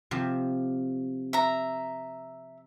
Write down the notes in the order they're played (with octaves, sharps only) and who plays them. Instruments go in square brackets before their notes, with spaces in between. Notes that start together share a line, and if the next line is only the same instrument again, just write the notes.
[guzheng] C3 F3 G4
[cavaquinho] E5 A#5